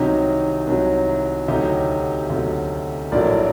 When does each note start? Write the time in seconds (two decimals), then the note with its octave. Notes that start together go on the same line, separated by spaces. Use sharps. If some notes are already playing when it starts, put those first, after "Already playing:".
Already playing: C2 C3 D#3 F#3 D#4 G4
0.67 C2 C3 D#3 F#3
1.48 D2 C3 F#3 D#4 G4
2.30 D2 C3 F#3
3.12 A#1 A2 F#3 A#4 D5